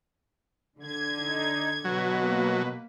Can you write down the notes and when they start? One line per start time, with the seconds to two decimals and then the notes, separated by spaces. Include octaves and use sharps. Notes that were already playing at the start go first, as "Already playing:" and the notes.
0.79 D3 G#6
1.18 D#4
1.84 B2 F#3 B4
2.22 A#3